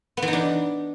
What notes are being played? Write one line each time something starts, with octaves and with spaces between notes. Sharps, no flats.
B3
E3
D#4
D4